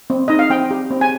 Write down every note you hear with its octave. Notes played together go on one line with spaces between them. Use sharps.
C4
D#4 D#5
F5
C4 G5
G4
C4
G#5